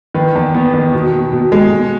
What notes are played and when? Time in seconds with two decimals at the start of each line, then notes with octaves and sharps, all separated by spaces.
0.15 D#3 B4
0.35 E2
0.55 B3
0.74 D#3
0.94 B2
1.13 B2
1.33 B2
1.52 G#3
1.72 B2